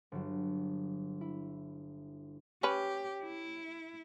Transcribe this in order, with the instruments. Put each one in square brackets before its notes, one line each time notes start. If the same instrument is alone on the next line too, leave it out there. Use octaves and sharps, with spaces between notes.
[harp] G1 F#3
E4
[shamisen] C#4 B4 [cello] G4
[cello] E4